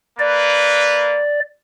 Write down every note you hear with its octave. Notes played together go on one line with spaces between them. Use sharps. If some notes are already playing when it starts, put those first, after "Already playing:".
A#3 B4 D5